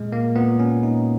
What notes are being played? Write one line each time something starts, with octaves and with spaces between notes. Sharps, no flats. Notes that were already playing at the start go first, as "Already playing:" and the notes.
Already playing: A#2 G#3
A#2 A#3
A#2 B3
A#2 C#4
A#2 D#4